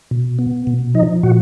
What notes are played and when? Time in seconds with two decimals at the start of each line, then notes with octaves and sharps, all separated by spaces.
0.11 B2
0.39 B3
0.67 B2
0.94 F3 D#4 D#5
1.23 A#2 F#4 F#5